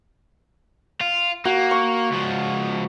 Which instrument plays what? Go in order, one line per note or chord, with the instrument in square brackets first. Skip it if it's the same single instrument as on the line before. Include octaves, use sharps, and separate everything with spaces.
[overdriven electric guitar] F4
[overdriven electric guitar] A#3 [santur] F#4
[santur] C#6
[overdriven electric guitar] C#2 F3